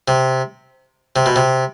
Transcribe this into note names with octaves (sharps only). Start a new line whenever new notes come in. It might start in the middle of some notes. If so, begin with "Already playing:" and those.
C3
C3
B2
C3